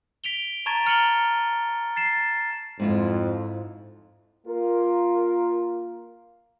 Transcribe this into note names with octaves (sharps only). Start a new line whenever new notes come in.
B6 D7 F7 G7
A5 A#5 C#6 G#6 A6 D7
A#5 F6 C#7 D#7 F#7 G7
A6 C7 E7
F2 G#2 E4 F4
A#3 F4 A#4